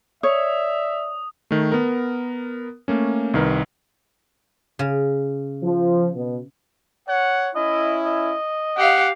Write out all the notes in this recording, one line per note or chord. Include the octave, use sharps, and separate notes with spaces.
C#5 D5 E5 D#6
D#3 A3
B3 A#4
A3 A#3 C#4
C2 D#3 A#4 B4
C#3
F3
B2
C#5 F#5
C#4 E4 D#5
D#5
G4 F5 F#5